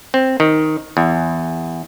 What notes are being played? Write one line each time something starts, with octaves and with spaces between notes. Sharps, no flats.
C4
D#3
E2